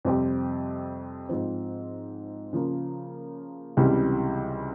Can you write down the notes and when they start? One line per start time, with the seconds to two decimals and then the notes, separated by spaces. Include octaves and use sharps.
0.05 F2 C3 G3 C4 G4
1.29 G#2 F3 C4
2.53 C#3 F3 A#3
3.77 C#2 C3 E3 G3